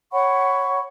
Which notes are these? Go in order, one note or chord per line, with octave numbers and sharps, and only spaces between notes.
C#5 F#5 B5 C#6